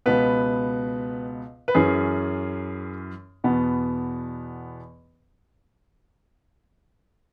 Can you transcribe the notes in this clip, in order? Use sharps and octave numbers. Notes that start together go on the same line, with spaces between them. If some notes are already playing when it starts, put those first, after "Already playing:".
C#2 B2 B3 B4
B4
F#2 E3 C#4 G#4
E2 B2 B3